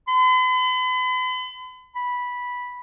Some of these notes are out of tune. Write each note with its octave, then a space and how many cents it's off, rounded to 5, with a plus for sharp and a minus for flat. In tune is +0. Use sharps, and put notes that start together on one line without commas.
B5 +45
B5 -10